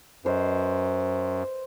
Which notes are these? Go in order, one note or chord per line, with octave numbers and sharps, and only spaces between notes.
F#2 B4 C5 D#5